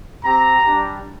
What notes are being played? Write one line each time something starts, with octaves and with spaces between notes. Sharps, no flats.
C4 G4 A#5
G3 D4 G4